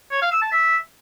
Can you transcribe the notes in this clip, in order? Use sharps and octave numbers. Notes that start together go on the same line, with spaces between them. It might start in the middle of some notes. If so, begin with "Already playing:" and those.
C#5
F5
E6
A5
E5